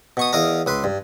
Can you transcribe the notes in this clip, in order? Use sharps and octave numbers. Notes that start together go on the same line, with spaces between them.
B2 C#6 D#6
E2 A#4 D#5 F5 A#5
C#2 B4 C6
G2